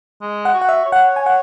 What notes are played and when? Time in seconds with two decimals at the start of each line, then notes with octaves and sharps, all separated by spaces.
0.21 G#3
0.45 F#5
0.54 F#4
0.61 F#5
0.69 E5
0.85 C#5
0.92 F#5
1.16 G#5
1.26 F#5